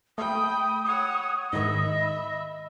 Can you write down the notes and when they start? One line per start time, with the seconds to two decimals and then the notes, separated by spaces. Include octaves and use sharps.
0.18 A3 G5 B5 D#6
0.85 C#5 F#5
1.53 G#2 D#3 D#5 E5 B5